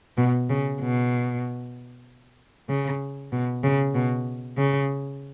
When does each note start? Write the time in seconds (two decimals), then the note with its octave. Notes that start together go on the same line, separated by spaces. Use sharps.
0.18 B2
0.50 C#3
0.81 B2
2.69 C#3
3.32 B2
3.63 C#3
3.95 B2
4.58 C#3